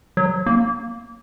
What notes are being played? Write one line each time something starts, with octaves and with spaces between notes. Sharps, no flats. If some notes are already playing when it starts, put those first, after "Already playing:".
F#3
A#3